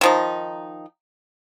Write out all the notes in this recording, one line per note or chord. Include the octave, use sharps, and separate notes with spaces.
D#3 F3 D#4